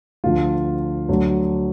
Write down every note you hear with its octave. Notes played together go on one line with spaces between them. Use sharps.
D2 D3 F3 F4
D2 D3 F#3